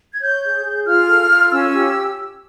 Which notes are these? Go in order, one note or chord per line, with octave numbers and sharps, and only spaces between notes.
G#6
C#5 G6
G#4
G#4
F4 F6
A4
F4
C#4 E6
G4